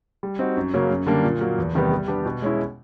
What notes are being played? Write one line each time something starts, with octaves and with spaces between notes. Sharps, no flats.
G3
C4 D#4 F#4
F#2
C#3 F#3 A#3 C#4
F#2
D3 G3 A#3 D4
A#2
F#3 A#3
E2
C3 D#3 G3 B3
G3
B3 D4 G4
B2
G#3 C#4 E4